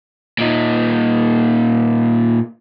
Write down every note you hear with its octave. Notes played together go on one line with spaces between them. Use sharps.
A#2 D#4